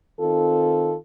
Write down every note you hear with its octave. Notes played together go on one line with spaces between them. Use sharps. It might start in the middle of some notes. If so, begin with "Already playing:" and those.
D#3 C4 F4 A4